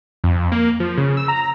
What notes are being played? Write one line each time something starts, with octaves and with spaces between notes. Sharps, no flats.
F2
A#3
F3
C#3
E6
A#5